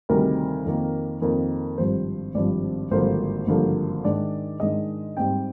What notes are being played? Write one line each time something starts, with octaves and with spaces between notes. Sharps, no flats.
D2 C3 D#3 G3 C4 A#4
F2 D#3 A#3
F2 D#3 A#3 A#4
G#1 G2 F3 C4 C5
G#1 G2 F3 C4 D5
G#1 G2 D3 F3 A#3 C5
G#1 G2 D3 F3 A#3
G#2 D#3 G#3 D4 D5
G#2 D#3 G#3 D4 D#5
G#2 G3 C4 G5